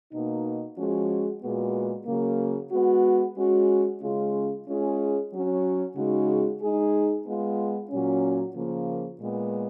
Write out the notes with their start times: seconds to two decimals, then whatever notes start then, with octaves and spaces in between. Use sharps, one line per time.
0.12 B2 A#3 D#4
0.76 F3 G#3 C#4 F#4
1.41 A#2 G#3 B3 F#4
2.06 C#3 F#3 A#3
2.71 G#3 B3 F#4
3.36 G#3 C#4 F#4
4.01 C#3 G#3 C#4 F4
4.67 G#3 C#4 F4 G#4
5.31 F#3 C#4 F#4
5.95 C#3 G#3 D#4 F#4
6.61 G#3 D#4 G#4
7.26 G#3 B3 F4
7.90 A#2 F#3 C#4
8.55 C#3 F3 A#3
9.20 A#2 G#3 B3